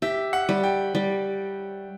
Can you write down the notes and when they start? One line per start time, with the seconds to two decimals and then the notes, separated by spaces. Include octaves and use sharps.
0.02 G4 E5
0.33 F#5
0.49 G3
0.64 G5
0.95 G3